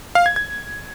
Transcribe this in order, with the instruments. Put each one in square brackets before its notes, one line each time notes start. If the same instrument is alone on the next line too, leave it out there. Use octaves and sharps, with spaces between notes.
[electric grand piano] F5
G#6
G#6